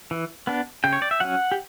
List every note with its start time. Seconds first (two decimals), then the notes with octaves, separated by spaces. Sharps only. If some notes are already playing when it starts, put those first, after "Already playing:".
0.11 E3
0.47 B3 D4
0.84 C#3 G5
0.93 C#5
1.02 D5
1.11 E5
1.20 F#3 C#4 F#5
1.52 G4